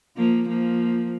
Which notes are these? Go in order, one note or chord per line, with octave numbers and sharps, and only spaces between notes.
F3 A#3
F3 A#3